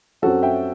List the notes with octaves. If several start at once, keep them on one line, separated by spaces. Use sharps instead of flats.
F#2 F#3 C4 F#4 A4
E5 G5